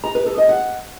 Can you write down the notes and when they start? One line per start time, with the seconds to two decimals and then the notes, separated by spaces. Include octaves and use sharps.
0.04 A#5
0.15 B4
0.26 A4
0.38 D#5
0.49 F#5